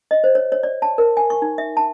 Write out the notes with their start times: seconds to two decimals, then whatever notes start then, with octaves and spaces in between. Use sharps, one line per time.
0.11 D#5
0.24 C5
0.35 C#5
0.52 C#5
0.63 D5
0.82 A5
0.98 A#4
1.17 G#5
1.30 C#6
1.42 D#4
1.58 E5
1.77 A5